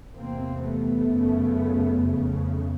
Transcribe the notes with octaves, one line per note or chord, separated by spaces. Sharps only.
E2 C3 A#3 C4
A3 B3
F#2 C#3
F2 C#3